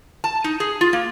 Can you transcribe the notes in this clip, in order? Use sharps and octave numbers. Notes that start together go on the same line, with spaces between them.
A5
D#4
G#4
F4
A#3